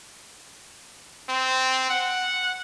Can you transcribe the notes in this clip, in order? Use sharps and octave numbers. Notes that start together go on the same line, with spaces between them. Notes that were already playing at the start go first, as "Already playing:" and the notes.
C4
F#5